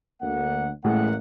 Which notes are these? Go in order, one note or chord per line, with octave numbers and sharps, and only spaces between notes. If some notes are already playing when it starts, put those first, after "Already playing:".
D2 A#3 F#5
A1 A2 G#3 A#3 F#5